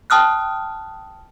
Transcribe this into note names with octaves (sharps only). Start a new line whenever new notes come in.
G5 A5 D#6 F6 F#6